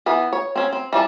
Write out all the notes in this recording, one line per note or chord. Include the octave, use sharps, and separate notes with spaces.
E3 B3 B4
C#5
C4 C#4
C4
E3 G3 D5 A5